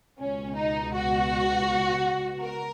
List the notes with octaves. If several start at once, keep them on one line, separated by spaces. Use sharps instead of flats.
C#2 B2 C#4
D#4
F#4
A#4